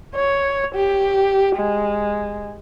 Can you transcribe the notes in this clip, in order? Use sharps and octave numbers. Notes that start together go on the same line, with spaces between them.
C#5
G4
G#3